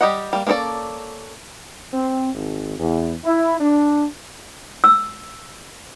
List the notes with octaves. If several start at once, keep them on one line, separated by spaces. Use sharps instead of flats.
G3 G4 D#5 F#5
G3 A#3
A#3 C#4 G#4 A4 D5
C4
G#1
E2
E4
D4
E6